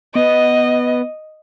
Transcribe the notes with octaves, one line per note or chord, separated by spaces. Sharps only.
B3 D#5